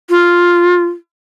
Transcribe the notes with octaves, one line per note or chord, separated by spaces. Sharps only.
F4